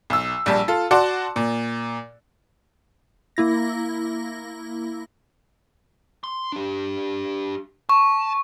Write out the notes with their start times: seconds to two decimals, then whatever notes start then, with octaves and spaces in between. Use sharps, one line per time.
0.10 B1 E6
0.46 A#1 G3 A5
0.68 F4 A4
0.91 F#4 D5 F#5 A5 C6 D6
1.36 A#2
3.37 A#3 E4 A#6
6.24 C6
6.52 D4 G4
7.89 A5 C#6